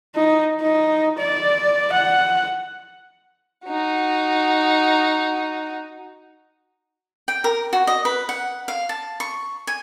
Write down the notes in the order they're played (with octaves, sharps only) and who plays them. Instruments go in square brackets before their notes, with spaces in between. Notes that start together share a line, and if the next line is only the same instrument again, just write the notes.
[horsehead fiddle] D#4
D#4
D5
F#5
[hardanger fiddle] D#4 F#4
[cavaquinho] G5
A#4
F#4
D#5
B4
F#5
F5
A5
C#6
G#5